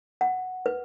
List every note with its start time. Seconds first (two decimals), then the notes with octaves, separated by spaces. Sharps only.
0.21 F#5
0.66 B4